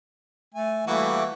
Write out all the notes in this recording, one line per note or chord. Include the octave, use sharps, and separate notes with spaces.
A3 G#5
E3 G3 A3 A#3 F#4 D6